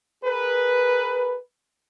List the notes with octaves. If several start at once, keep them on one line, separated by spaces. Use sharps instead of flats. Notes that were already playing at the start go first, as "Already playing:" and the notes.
G#4 A#4 B4